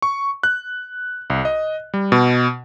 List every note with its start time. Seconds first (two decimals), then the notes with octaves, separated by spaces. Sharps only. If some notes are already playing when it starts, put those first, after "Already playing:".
0.02 C#6
0.43 F#6
1.30 C2
1.45 D#5
1.94 G3
2.12 B2